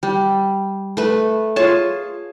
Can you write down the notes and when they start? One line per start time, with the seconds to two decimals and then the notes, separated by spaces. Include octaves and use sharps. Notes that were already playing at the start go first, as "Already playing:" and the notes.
0.03 G3
0.97 A3 B4
1.56 F4 G#4 C#5 A5